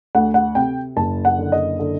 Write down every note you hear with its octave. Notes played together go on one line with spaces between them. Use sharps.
D2 F#5
F#5
C3 G5
F#1 A5
F#5
D3
D#5
D3